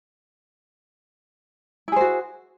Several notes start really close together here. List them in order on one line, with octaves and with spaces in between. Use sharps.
E4 G#4 C5 F#4